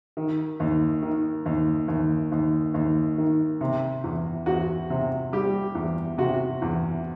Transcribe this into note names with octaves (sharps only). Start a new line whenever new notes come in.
D#3
D#2
D#3
D#2
D#2
D#2
D#2
D#3
C3
E2
E2 F#4
C3
G3 G4
E2
C3 F#4
E2